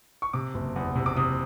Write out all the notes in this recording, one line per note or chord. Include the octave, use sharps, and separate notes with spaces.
C#6
C3 D6
F#1
E2
C3
D6
C3 D#6